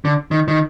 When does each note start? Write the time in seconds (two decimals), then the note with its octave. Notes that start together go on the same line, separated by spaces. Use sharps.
0.05 D3
0.31 D#3
0.48 D#3